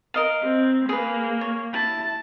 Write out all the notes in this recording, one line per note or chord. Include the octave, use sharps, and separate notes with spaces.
A#4 D#5 F5
C4
A#3 G#4 B4
C#5
E4 A5